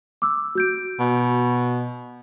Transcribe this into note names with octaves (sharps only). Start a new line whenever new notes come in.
D6 E6
F#4 G6 D7
B2